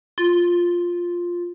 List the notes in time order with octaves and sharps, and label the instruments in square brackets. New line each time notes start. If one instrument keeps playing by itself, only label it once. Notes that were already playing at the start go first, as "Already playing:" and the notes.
[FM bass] F4